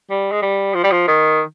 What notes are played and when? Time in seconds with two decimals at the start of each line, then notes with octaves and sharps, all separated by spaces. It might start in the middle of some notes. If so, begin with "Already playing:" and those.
0.10 G3
0.31 G#3
0.42 G3
0.74 F3
0.83 G3
0.91 F3
1.08 D#3